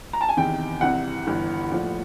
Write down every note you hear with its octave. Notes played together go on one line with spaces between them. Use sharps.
A#5
A5
G#5
E2 C3 D#3 G5
C2 C3 E3 F#5
G1 G2 E3
A#1 A2 F3